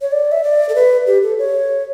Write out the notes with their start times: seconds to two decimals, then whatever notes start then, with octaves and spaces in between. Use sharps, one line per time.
0.02 C#5
0.12 D5
0.32 E5
0.44 D5
0.69 A4
0.75 B4
1.07 G4
1.23 A4
1.39 C#5